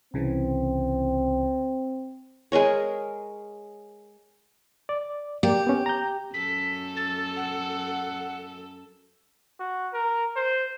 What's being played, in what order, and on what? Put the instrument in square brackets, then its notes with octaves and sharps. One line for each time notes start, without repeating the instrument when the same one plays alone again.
[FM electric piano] C2 C#3 E3 [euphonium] C4
[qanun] G#3 G#4 A#4 C#5
[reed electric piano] D5
[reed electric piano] A#3 D5 G5 [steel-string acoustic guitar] G4
[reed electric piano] B3 C#4
A#5 G6
[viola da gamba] F#2 A4 [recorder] B6
[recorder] A6
F#5
[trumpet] F#4
A#4
C5